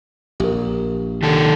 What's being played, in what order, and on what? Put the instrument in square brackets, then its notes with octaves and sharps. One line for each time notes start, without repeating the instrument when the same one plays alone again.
[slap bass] A#1 [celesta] G4 A#4
[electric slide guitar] D#3 A4